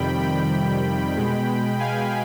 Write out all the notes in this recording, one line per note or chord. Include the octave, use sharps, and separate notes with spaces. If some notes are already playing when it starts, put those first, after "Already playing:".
Already playing: F2 C3 D#3 G3 G5 B5
G5 B5
B2 G#3
F5 G#5